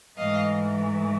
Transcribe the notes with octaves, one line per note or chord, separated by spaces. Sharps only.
G#2 E3 A3 D#5 F5